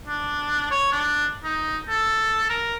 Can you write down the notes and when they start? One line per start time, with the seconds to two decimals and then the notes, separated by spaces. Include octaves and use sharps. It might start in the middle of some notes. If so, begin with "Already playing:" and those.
0.07 D4
0.71 C#5
0.92 D4
1.43 D#4
1.89 A4
2.50 A#4